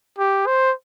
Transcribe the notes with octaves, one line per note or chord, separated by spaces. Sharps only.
G4
C5